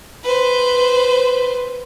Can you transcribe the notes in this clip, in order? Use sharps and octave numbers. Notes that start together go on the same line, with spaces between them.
B4 C5